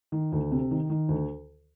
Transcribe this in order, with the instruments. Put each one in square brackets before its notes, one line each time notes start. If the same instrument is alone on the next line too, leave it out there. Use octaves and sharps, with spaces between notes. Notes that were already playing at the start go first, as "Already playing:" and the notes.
[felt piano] D#3
D2
C3
D#3
D#3
D2